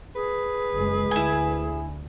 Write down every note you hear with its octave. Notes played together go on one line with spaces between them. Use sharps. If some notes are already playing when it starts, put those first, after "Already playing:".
G#4 B4
F#1 G#3
D2 E4 G#5